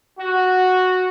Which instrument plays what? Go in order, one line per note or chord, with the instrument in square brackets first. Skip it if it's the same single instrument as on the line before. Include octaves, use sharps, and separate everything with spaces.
[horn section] F#4